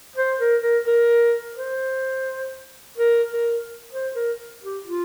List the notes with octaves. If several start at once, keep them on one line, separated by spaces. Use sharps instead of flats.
C5
A#4
A#4
A#4
C5
A#4
A#4
C5
A#4
G4
F4